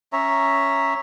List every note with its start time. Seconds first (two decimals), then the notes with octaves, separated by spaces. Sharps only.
0.13 C#4 C#5 E5 A#5